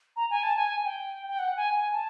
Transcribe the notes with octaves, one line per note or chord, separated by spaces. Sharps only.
A#5
G#5
A5
G#5
G5
G5
F#5
G#5
G#5
A5